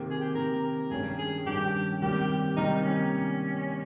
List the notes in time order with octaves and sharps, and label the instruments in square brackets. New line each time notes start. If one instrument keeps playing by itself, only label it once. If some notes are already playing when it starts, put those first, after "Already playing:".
Already playing: [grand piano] C3 D#3 A#3
[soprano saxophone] G#4
G4
[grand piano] C3 D#3 A#3 [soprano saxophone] A#4
[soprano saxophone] A#4
[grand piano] G2 D#3 G3 C#4 [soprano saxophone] G#4
[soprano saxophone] G#4
[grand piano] G2 D#3 G3 C#4 [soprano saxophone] G4
[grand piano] C3 D#3 G3 A#3 [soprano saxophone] G4
[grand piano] C3 D#3 G3 A#3 [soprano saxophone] D#4
[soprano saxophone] C#4